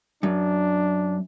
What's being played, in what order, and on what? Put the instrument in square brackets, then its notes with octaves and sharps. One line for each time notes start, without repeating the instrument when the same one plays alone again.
[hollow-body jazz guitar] F#2 [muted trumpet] D4